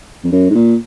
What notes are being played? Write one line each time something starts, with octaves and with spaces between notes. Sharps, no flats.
F2
F#2
G#2
A#2